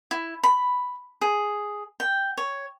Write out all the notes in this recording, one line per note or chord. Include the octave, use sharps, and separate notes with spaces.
E4
B5
G#4
G5
C#5